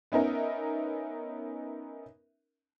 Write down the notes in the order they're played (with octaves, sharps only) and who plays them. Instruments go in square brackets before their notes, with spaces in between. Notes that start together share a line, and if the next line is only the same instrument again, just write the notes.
[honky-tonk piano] B3 C#4 D#4 A#4 E5